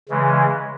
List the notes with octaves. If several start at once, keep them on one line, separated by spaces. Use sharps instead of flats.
C#3 E3 G#3